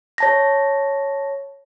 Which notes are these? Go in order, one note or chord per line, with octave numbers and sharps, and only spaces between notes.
C#5 A5 A#6